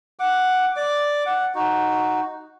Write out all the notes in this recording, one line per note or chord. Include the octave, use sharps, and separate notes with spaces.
F#5 D6
D5 D6
F#5
D#4 F#4